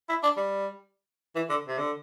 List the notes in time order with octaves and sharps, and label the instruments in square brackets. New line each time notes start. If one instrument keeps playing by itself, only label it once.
[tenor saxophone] E4
D4
G3
E3
D3
C3
D3